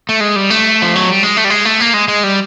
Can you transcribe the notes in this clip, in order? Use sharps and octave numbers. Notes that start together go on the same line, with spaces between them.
A3
G#3
G3
A3
F3
F#3
G3
G#3
A3
G3
G#3
A3
A#3
G#3
G#3
G3